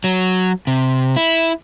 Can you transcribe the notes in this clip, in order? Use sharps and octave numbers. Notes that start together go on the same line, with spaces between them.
F#3
C3
E4